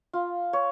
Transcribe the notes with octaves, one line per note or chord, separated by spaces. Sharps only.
F4
C#5